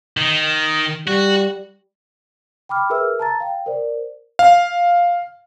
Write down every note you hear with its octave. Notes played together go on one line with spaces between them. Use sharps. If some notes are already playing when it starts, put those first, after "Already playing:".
D#3
G3 F#4
G5 B5 D6 F6
G#4 A#4 B4 E5 E6 F6
A5 A#5 A6
F5 G5
A#4 C5 D5
F5